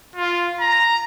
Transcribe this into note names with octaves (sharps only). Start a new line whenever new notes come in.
F4
A#5